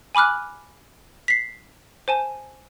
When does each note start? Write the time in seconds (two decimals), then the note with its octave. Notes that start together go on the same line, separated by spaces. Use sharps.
0.15 G#5 B5 D6 F6 F#6
1.28 B6 C7
2.08 C5 G#5 A5